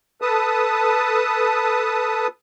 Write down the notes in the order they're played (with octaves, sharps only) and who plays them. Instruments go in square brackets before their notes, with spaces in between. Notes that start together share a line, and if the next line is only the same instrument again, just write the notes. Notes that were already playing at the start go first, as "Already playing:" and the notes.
[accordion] A4 B4 A5 D#6